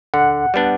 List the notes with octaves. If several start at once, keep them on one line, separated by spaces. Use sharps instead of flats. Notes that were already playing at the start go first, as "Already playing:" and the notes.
D3 F#5
G3 B3 D4